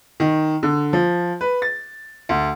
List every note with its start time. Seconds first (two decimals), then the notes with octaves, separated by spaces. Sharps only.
0.20 D#3
0.63 D3
0.93 F3
1.41 B4
1.62 A6
2.29 D2